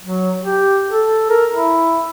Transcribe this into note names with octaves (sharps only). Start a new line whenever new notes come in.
F#3
G4
A4
A#4
E4